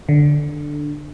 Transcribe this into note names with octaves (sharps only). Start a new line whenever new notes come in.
D3